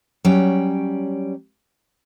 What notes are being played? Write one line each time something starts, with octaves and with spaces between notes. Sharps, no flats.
F#3 G3 C#4 G5